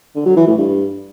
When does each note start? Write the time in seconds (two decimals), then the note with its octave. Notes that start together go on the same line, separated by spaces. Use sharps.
0.15 D3
0.26 F#3
0.37 E3
0.47 A2
0.58 G2